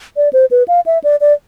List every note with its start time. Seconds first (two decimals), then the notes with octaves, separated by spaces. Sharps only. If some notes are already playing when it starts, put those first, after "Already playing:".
0.17 D5
0.33 C5
0.51 B4
0.68 F5
0.86 E5
1.04 D5
1.21 D5